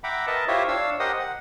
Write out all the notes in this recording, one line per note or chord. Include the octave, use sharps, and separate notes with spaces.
E5 F#5 G5 A#5 B5 D6
A#4 B4 D#5 E5 A5
E4 F4 G4 C5 C#5 E5
D4 C#5 F5 E6
G4 A#4 C5 D#5 F#5 D#6
F#5